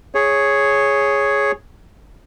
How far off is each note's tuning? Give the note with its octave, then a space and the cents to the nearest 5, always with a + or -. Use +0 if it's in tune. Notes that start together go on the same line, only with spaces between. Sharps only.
G#4 +0 C#5 +0